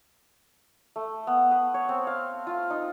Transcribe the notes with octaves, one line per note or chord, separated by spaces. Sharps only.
A3
B3
B4
C#5
C4
F5
F4
D#4